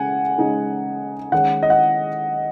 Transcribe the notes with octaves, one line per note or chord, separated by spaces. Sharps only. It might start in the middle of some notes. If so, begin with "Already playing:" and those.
Already playing: C#3 G#3 F#5 G#5
C#3 G#3 D#4
D#3 G#3 C#4 F#5
D#5
F#5